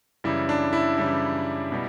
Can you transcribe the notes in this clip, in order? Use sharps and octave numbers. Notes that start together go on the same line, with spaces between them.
F#2 C#3 E3 G3 E4
D4
E4
F#2 C#3 E3 G3
B2 G3